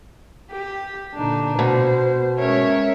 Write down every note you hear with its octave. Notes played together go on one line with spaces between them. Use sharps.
G4
A#2 D3 D4 D#4
B2 B3 C5
G#3 C#4 A#4 C#5 E5